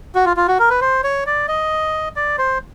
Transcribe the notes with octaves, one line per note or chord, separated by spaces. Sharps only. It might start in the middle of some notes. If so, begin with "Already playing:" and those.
F#4
F4
F4
F#4
A#4
B4
C5
C#5
D5
D#5
D5
C5